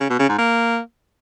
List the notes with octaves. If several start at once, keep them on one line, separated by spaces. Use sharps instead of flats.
C#3
B2
C#3
G#2
A#3